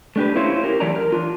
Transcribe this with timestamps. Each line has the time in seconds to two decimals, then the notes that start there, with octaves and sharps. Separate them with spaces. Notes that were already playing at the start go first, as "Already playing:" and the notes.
0.16 A3 D4 G4 B4
0.35 C#4 E4 F4 C5 C#5
0.64 E4 G4 A#4
0.80 E3 F#3 A3 D5 A#5
0.96 A#4
1.12 D4 F4